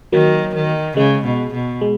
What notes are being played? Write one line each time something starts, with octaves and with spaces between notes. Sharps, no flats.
D#3 F#3 A#3
D#3
C#3 G#3
B2
B2
G#3